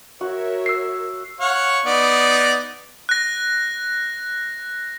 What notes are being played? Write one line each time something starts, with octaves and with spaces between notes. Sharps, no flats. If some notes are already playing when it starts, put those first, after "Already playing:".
F#4 A#4 C#5 E5
E6 C7
C#5 F5 F#5
B3 D#4 D5
F#6 A#6